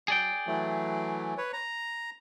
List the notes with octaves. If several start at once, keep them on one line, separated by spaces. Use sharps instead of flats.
F#3 G#4 D5 G5
E3 F#3 A3
B4 C#5
A#5